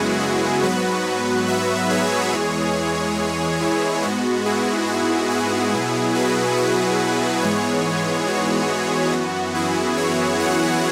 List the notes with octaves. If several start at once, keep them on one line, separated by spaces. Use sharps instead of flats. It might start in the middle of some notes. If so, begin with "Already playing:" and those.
Already playing: F#2 C#3 G#3 B3 E4 F#4 G#4
F#4
G#2 F#3 B3 F#4 B4
B4 E5
G#4 C#5
E2 E3 G#3
E4
G#2 G#3 B3 F#4
E4 G#4
F#4
E4 G#4
B2 F#3 B3
F#4 B4
F#4 B4
G#2 E3 G#3 B3 G#4 C#5
F#4
F#2 E3 B3
E4 G#4
G#4 C#5
C#5 F#5